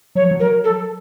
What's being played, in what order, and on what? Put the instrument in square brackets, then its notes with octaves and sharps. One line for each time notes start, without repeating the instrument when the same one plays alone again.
[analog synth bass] F#3 [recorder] C#5
[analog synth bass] F3
F#3
[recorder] A#4
A4